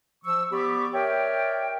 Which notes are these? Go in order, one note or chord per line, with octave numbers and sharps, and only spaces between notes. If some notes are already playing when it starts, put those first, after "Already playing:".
F3 C#6 E6
B3 G4 D5 B5 C#6 D6
A#4 C#5 D5 E5 G5